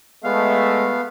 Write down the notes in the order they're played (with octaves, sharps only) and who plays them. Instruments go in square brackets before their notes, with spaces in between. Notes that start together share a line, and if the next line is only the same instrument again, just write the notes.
[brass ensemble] G#3 A3 [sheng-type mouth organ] B3 F5